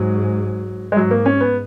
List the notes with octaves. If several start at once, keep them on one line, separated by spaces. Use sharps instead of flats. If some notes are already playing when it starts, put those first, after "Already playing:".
Already playing: G#2 F#3
G#3
G#2 F#3
A#3
C#4
B3